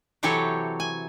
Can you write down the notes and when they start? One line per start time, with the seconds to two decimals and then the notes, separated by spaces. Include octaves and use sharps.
0.23 C3 E3 F#3 G4 A4 C#5
0.80 G#5